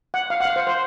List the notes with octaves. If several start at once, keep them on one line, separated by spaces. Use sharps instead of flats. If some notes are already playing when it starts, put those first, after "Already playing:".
F#5
F5
F#5
F5
C5
C5